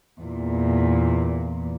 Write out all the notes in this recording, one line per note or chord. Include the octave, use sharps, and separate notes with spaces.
E2 A#2